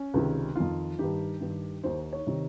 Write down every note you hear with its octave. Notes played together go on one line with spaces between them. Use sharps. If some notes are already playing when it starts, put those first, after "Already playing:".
Already playing: C#4
C#2 C3 D#3
F2 D#3 F4
G2 D#3 G4
G2 D#3
D#2 D#3 C5
C#5
C3 D#3